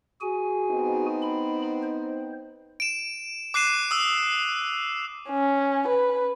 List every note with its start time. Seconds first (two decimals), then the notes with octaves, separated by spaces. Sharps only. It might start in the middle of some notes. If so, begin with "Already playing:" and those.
0.21 F#4 G#4 G#5
0.71 B3 C4 D#4
1.22 B5
1.83 C5
2.80 D7 E7
3.54 D6 F#6 C7 D#7 E7
3.91 D#6 E6
5.30 C#4
5.87 B4